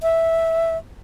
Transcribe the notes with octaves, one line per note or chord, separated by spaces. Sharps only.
E5